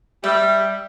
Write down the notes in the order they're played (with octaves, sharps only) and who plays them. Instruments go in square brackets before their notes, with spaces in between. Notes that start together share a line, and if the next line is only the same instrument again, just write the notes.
[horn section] G3 [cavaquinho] E5